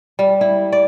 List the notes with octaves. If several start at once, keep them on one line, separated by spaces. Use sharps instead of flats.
G3
E4
D5